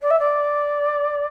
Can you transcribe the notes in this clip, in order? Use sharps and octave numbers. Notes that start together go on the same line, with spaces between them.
D5
E5
D5